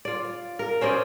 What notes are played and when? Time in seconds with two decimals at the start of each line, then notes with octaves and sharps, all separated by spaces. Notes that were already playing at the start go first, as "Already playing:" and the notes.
0.05 F4 D5
0.59 A#4
0.81 C#4 C5 D5 D#5